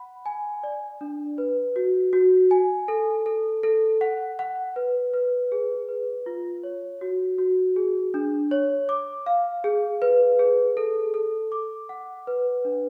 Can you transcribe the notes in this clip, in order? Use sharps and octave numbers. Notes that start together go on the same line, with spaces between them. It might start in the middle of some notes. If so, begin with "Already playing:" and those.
Already playing: F#5 B5
G#5
D5
D4
B4
F#4
F#4
G#5
A4
A4
A4
F#5
F#5
B4
B4
G#4
B4
F4
C#5
F#4
F#4
G#4
D4
C#5
D6
F5
G#4
B4
G#4
A4
A4
D6
F#5
B4
D4